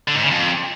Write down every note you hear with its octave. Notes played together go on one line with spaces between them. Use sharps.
D3
G#2
C#3
F2